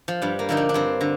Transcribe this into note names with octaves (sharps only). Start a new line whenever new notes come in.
F3
G2 G3
A#3
D3 F3 D#4
D4
D4
G2 C4
D3